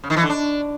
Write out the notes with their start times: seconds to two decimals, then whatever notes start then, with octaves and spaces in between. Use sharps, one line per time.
0.04 C#3
0.10 D#3
0.16 E3
0.23 D3
0.29 D4